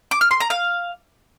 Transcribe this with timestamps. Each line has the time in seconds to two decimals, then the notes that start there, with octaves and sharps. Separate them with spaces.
0.11 D6
0.21 F6
0.31 C6
0.40 A#5
0.50 F5